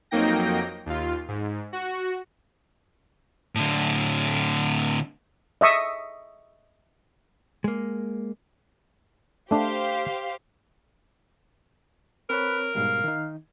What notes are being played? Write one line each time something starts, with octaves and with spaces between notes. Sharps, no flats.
F2 F#3 A#3 D#4 G5 A#6
D#2 F4
G#2
F#4
A2 D3
D#5 E5 C#6 D#6
G#3 A#3
A3 D4 G4 C5 F5
C4 A#4 B4 C#5
G#2 B2 G3 F5
D#3 D#4